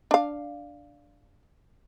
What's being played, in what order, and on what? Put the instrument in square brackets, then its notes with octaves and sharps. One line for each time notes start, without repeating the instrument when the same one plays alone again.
[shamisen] D4 F5